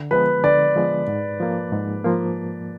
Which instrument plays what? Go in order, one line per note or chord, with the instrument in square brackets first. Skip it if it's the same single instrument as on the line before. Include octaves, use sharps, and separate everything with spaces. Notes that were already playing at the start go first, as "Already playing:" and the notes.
Already playing: [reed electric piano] D3
[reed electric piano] F3 G#3 B3 [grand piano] B4
[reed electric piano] D3 [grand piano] D5
[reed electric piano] F3 G#3 B3
G#2
F3 A#3
G#2
F3 A#3